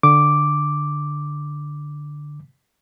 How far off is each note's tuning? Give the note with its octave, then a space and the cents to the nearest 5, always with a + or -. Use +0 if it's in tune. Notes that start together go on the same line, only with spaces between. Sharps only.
D3 +0 D6 +0